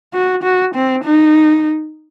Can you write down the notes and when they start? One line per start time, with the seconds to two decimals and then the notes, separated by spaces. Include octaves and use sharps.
0.14 F#4
0.43 F#4
0.75 C4
1.04 D#4